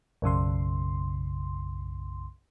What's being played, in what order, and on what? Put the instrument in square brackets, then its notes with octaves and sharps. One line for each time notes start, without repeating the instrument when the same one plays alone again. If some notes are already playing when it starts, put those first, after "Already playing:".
[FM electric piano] B1 F#2 C#3 C6